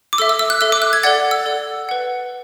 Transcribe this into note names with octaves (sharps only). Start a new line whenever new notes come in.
D6
A4 E5 E6
E6
E6
F#6
A4 E5 E6
D6
F#6
G#6
A4 D5 F#5 A6
E6
A4 D5 F#5
B4 F#5